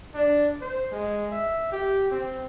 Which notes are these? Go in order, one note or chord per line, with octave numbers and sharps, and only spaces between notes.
D4
C5
G#3
E5
G4
C4